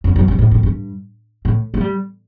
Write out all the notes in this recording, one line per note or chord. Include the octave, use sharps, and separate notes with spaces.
F#2
F#2
G2
A2
A2
G2
A2
A3
G3